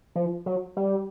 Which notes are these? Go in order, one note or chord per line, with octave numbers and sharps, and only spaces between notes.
F3
F#3
G3